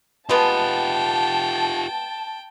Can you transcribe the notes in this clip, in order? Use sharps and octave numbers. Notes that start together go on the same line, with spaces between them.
G#3 B3 F4 G4 G5 A5